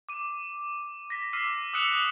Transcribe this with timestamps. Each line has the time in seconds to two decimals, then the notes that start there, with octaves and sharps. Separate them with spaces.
0.09 D6 D#7
1.10 A#6 B6
1.33 D6 E6 F6 C7 D#7
1.73 D#6 E6 F#6 C#7 E7